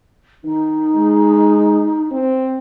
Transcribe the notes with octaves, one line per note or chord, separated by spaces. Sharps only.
D#3 D#4
G#3
C4